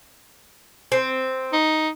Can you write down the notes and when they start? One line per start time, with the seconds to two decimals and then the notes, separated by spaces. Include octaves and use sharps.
0.92 C4
1.53 D#4